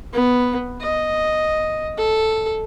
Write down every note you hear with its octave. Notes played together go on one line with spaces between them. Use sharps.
B3
D#5
A4